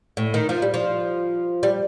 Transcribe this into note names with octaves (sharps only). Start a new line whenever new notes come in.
A2
D#3
F3
G3
F3
G3